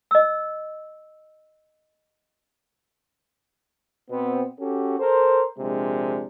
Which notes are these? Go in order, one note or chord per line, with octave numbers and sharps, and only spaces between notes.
D#5 E6
B2 B3 C4
C#4 F#4 G4 A4
A4 A#4 C5
A#1 C3 G#3 D4